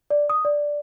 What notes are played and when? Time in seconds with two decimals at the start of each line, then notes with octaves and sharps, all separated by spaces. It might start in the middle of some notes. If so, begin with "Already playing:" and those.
0.10 D5
0.30 D#6
0.45 D5